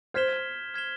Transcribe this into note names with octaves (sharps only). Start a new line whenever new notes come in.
C5 F6 G#6 B6 E7 G7
F6 G#6 B6 E7 G7